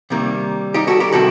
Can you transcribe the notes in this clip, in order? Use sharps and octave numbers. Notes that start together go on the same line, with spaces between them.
C3 D#3 G3 A#3
D#4 G4
F#4 A4
G4 A#4
C3 D#3 G3 F#4 A4